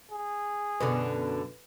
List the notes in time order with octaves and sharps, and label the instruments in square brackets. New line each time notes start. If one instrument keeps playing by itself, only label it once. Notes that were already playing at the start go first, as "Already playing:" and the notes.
[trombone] G#4
[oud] F#2 B2 D3 [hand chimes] B4